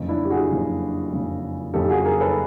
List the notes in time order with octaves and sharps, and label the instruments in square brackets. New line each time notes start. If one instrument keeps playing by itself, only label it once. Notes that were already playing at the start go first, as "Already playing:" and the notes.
Already playing: [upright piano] F#1 F2 C#3
D4 E4
G4
F#4 G#4
F#1 F2 C#3
F#1 F2 C#3
F#1 F2 C#3 G4 A4
F#4 G#4
G#4 A#4
A4 B4